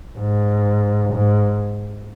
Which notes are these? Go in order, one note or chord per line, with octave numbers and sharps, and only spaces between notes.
G#2
G#2